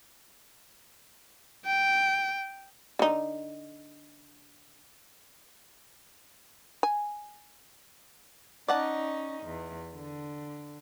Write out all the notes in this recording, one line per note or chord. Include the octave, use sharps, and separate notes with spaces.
G5
D3 D#4
G#5
C#4 D#4 D5 F#5 A5
E2
D3